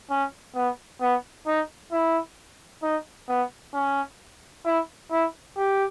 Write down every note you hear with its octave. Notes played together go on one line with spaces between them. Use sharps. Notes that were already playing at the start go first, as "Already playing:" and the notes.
C#4
B3
B3
D#4
E4
D#4
B3
C#4
E4
E4
G4